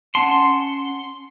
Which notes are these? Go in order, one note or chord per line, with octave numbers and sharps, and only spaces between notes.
C#4 F#5 A5 C6